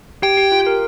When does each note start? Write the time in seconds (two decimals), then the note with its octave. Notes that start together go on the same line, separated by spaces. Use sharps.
0.22 G4 G5
0.37 G4
0.52 F4
0.66 A#4